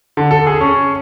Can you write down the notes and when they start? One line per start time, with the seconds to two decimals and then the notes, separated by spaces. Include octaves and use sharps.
0.17 D3
0.31 A4
0.47 G#4
0.60 C#4